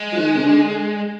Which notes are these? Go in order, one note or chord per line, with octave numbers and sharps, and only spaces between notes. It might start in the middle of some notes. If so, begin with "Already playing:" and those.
Already playing: G#3
F3
D#3
C3
D3